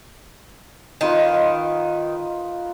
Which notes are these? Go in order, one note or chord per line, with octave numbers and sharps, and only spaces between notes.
D#3 D#4 F4 B4